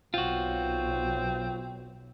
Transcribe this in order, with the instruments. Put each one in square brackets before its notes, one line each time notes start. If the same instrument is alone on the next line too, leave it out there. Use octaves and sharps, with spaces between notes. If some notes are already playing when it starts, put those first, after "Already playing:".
[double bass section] B1 [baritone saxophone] C4 [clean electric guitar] F4 F#4